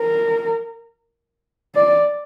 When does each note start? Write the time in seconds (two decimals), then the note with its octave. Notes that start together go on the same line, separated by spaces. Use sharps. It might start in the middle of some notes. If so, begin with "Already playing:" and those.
Already playing: A#4
1.75 D5